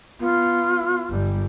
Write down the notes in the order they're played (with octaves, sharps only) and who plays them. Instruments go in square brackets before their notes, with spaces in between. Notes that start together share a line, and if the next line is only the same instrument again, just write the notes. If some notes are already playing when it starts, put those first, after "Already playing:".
[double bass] B3 [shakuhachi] F4
[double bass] G1 G3